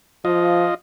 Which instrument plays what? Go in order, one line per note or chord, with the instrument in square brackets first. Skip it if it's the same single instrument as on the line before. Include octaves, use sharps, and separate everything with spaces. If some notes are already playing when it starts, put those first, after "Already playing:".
[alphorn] F3 [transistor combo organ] F4 D#5